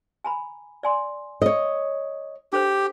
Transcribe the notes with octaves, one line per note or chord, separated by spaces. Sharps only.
G#5 A#5 B5
D5 G#5 C6
C#5 D#5
D4 G4 A4 C5